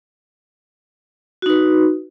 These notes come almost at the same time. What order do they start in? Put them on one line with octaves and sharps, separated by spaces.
F#4 D#4 B4